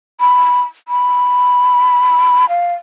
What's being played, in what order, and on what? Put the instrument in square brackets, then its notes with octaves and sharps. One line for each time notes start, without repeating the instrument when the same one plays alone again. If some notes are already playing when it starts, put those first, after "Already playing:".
[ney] B5
B5
F5